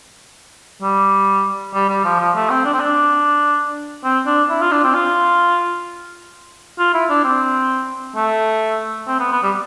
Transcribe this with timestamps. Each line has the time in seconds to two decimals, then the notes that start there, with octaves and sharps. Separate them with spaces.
0.82 G3
1.73 G3
1.89 G3
2.04 F3
2.20 F3
2.36 A3
2.50 C4
2.65 D4
2.74 C4
2.80 D4
4.04 C4
4.26 D4
4.50 E4
4.61 F4
4.72 D4
4.84 C4
4.95 F4
6.78 F4
6.94 E4
7.10 D4
7.24 C4
8.16 A3
9.08 C4
9.19 B3
9.32 B3
9.43 G3